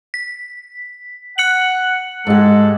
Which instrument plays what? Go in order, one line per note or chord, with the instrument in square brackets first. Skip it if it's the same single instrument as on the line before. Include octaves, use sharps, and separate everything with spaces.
[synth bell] B6
[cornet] F#5 [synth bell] F#6 C#7 F#7
[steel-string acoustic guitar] G#2 G4 [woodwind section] G#3 [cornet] A4